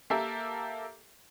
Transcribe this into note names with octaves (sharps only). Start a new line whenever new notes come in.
A#3 G4 A4 A#4 E5